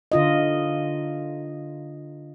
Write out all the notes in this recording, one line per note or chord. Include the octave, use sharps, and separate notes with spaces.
D3 F4 D#5